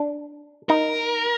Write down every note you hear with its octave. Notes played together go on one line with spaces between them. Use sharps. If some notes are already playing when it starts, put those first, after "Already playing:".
Already playing: D4
D#4 A#4